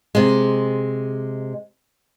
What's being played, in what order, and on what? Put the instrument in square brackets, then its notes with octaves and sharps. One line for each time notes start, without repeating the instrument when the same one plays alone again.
[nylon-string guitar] C3 G#3